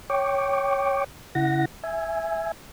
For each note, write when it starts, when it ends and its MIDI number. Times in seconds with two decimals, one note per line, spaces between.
0.10 1.04 73
0.10 1.04 79
0.10 1.04 85
0.10 1.04 86
1.35 1.65 49
1.35 1.65 64
1.35 1.65 78
1.35 1.65 94
1.84 2.52 76
1.84 2.52 80